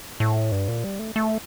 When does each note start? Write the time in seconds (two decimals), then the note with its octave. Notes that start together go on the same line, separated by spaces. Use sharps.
0.20 A2
0.52 G2
0.68 A#2
0.84 G3
0.99 A3
1.16 A3